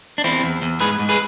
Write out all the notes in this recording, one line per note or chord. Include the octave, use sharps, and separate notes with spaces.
D4
E2 C4 E4
E2
E2
G#2 G#4 B4
G#2
G#4 B4